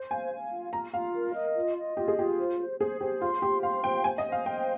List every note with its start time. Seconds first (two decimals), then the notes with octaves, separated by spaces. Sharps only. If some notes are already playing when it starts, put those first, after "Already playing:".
Already playing: C5
0.10 F5 G#5
0.32 F5
0.52 F4
0.72 F4 A#5
0.93 F4 F5
1.15 A#4
1.35 D#5
1.55 F4
1.77 D#5
1.97 F4 G4
2.08 G#4
2.18 F4 G4
2.39 C5
2.59 C5
2.79 G#4 C5
3.00 G4 C5
3.21 F4 C6
3.42 G4 C5
3.63 F5 C6
3.83 C5 G5
4.04 C5 G#5
4.18 D#5
4.25 C5
4.32 F5
4.46 C5 G5